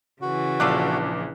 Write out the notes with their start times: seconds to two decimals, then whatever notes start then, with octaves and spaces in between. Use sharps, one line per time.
0.22 C#3 E3 F#4
0.60 A#1 D4 F4 A4 D6 F#6